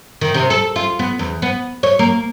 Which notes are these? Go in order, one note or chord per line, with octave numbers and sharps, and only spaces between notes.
D#3
C3
A4
F4
B3
E2
B3
C#5
A#3